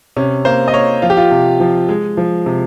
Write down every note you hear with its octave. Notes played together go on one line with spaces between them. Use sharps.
C3 C#4
A#3 C5
D#5
A#3 C#5
F3 F4
G4
F4
C3
F3
G#3
F3
C3